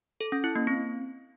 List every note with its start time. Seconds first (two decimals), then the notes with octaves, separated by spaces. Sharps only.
0.21 A4
0.32 C#4
0.44 E4
0.55 A#3
0.67 C4